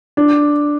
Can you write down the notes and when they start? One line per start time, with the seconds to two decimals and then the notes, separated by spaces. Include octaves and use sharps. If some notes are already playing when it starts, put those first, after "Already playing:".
0.17 D4